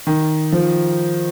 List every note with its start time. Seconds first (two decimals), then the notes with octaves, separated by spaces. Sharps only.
0.07 D#3
0.52 F3